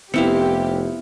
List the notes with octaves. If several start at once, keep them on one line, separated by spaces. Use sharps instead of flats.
F1 B3 C4 E4 G4 F5 C#7